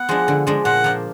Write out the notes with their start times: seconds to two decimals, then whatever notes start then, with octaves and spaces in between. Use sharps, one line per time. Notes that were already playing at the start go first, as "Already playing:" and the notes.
Already playing: B3 F#5
0.09 F3 G#3 D4
0.28 D3
0.47 F3 G#3 D4
0.65 A#2 F#5
0.84 F3 A#3 D4